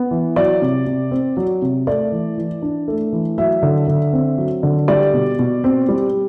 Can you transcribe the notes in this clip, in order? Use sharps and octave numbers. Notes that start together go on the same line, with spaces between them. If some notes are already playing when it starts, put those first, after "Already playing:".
Already playing: B3
E3
F#3 D5
C3
C3
C4
F#3
C3
A3 D5
E3
E3
D4
A3
E3
F#3 E5
D3
D3
C4
F#3
D3
G3 D5
B2
B2
C4
G3